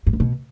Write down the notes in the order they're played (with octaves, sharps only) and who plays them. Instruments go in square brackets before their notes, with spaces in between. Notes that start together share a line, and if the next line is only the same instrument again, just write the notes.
[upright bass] G2
G#2
B2